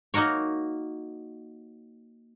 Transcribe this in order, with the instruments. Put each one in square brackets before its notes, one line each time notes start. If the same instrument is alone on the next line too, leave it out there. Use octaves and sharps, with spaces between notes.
[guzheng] A#3 D#4 F#4 A#4 C#5